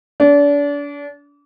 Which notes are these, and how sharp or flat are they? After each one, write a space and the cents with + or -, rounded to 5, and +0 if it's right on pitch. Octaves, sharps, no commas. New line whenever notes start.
D4 -35